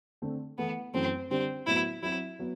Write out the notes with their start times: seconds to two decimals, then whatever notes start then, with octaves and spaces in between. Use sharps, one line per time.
0.22 D3 A3 C4
0.58 E3 A3 B3 E4
0.94 F#2 E3 A3 C4
1.30 D3 G3 C4 D4 G4
1.67 A2 F#3 B3 E4 F#4
2.03 F#3 C4 E4 F#4
2.39 F#3 B3